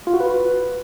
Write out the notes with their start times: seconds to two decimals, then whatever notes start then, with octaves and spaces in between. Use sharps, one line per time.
0.07 F4
0.14 F#4
0.20 B4